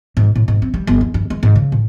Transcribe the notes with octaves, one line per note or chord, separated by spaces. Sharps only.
G#2
A2
G#2
C4
G3
G1
E2
G2
G#3
G#2
C#3
A2